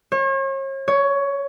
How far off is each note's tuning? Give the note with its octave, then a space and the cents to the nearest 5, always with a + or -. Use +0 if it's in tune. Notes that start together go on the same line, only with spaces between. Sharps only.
C#5 -40
C#5 +15